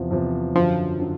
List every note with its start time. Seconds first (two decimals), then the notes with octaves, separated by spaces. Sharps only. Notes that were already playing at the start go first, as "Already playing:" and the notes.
Already playing: E2 C3 F3
0.11 E2 C3 F3
0.55 F#2 D3 F3 F#3
0.99 D3 F#3